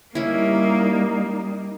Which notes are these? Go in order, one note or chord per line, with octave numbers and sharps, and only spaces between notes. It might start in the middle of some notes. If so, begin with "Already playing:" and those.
G3 A#3 C#4 D#4 E4